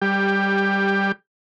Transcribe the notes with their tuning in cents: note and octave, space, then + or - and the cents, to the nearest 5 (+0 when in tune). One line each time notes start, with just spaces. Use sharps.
G3 +0 G4 +15